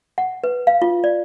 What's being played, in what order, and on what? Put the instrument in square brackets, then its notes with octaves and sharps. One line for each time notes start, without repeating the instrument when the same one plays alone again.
[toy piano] F#5
B4
F5
F4
D5